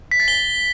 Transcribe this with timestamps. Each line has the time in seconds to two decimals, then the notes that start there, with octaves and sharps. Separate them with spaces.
0.11 B6
0.20 A6
0.28 G7